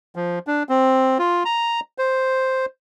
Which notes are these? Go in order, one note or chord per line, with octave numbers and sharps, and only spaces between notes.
F3
D4
C4
F4
A#5
C5